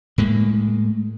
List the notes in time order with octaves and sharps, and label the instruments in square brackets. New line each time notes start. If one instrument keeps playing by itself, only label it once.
[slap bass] A2 G#3 A#3